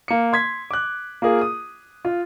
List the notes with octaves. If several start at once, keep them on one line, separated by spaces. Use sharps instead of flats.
A#3 C#7
C6 G#6 B6
D6 F#6
A#3 F4 G#4 A#4
D#6
F4